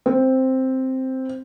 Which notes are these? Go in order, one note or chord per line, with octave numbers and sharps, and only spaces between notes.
C4